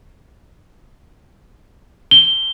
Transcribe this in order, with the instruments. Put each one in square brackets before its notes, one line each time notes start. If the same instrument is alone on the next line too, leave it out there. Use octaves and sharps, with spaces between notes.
[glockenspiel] G7